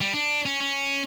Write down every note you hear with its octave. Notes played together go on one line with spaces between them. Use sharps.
G3
D4
C#4
C#4